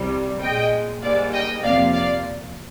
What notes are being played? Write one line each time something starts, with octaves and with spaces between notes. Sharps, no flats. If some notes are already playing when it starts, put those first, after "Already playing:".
Already playing: C2 C3 G3
A#2 G#3 D#5 G5
G#2 G3 A#3 D5 F5
D#5 G5
F2 C3 F3 A#3 D5 F5
D5 F5